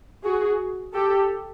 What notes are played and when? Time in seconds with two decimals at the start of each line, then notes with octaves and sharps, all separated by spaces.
0.24 F#4 G#4
0.94 G4 A4